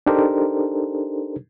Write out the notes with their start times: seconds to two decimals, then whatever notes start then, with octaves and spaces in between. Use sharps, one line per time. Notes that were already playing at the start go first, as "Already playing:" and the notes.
0.06 D4 D#4 G4 A4 A#4 C5